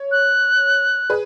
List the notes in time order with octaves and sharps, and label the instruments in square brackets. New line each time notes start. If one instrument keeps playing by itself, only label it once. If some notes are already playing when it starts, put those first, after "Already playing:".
Already playing: [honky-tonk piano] C#5
[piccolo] F#6
[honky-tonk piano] G#4 B4